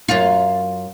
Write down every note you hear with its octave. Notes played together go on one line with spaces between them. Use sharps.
F#2 F4